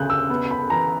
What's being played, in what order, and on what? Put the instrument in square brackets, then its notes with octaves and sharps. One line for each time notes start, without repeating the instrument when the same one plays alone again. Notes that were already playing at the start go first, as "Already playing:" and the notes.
Already playing: [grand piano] D2 C#3 [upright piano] F#6 G6
[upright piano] E6
[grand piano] B3
[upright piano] B5
[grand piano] E3 [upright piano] A#5